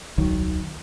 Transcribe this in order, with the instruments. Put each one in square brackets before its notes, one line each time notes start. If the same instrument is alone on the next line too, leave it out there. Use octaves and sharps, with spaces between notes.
[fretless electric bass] D#1 C2 D#3 F#3